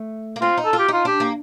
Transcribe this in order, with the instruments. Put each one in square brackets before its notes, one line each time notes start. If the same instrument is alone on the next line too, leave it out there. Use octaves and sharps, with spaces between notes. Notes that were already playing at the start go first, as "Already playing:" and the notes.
Already playing: [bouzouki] A3
A#3
[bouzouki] C4 [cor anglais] F4
[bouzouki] D#4
[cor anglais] A4
[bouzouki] F4
[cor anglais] G4
[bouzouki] D#4 [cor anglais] F4
[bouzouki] D4 [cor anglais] G4
[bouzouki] A#3